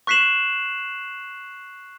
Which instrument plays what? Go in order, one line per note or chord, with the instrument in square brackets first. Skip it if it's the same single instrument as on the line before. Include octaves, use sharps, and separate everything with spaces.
[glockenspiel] C#6 F#6 B6 C7 E7 F#7